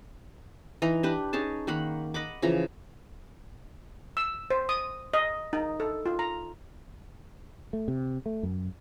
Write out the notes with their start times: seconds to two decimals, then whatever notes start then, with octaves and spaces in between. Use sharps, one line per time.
0.82 E3 D#4 D#5 A#5
1.03 D4 G4 B4
1.33 C#4 D#4 G#4 A5
1.67 D#3 A#3 F#5 B5
2.14 D#5 F#5 B5 D6
2.42 C#3 E3 F3 A#5
4.17 E6
4.50 C5
4.69 D#6
5.14 D#5
5.53 D#4
5.80 A4
6.06 F4
6.19 A#5
7.73 A3
7.88 C3
8.26 A3
8.43 F#2